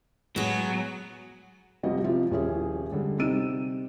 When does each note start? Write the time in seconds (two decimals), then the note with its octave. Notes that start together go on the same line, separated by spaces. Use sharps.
0.36 A2 F#3 G#3 B3 G#4
1.83 F1 F2 F3 G3 F#4 D#5
2.04 C3 F3 E4 F4
2.31 D#1 C#4 E4 G#4
2.91 D3 G3 G#3
3.18 C3 G3 D#4 E6 D#7